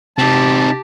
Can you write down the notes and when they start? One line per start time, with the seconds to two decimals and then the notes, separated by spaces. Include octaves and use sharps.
0.18 C3 C4 D#4 G4 A5 A#6 B6